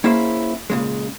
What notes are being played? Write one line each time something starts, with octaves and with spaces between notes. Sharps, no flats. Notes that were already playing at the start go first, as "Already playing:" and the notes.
A#3 C#4 E4 G#4 C5
A#2 C#3 G#3